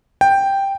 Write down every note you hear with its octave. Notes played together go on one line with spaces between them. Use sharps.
G5